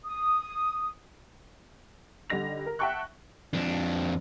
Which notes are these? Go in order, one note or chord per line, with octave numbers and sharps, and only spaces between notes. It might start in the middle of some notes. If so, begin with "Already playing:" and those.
D#6
D3 G3 D#4 A#6 F7
A#4
E5 F#5 G5 A5 C#6 F#6
F2 D4